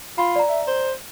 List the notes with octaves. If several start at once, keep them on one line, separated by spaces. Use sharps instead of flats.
F4 B5 C6
D5 A#5
E5
C5